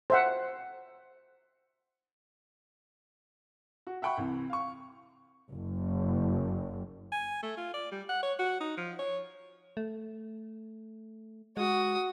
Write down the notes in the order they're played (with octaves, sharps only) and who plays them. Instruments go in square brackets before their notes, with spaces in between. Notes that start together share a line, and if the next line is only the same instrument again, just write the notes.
[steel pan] C5 E5 F#5
[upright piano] F#4
E5 F#5 G5 B5 C#6
C2 C3 E3
F5 C#6
[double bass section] F#1
[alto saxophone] G#5
A3
F4
D5
G3
F#5
C#5
F#4
D#4
F3
C#5
[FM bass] A3
[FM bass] G#3 [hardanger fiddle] F#4 D#6